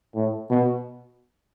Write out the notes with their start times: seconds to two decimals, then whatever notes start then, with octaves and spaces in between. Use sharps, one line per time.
0.15 A2
0.50 B2